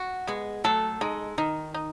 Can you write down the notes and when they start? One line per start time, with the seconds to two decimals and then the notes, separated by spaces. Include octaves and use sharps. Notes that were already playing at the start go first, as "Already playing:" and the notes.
Already playing: F#4
0.27 G#3 B3
0.64 F#3 A3 A4
1.01 G#3 D#4
1.38 D#3 D#4
1.74 D#4